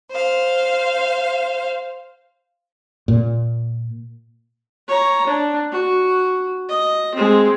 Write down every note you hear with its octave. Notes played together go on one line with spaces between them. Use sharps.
C5 F5
A#2
C#5 A#5
D4
F#4
D#5
G#3 C4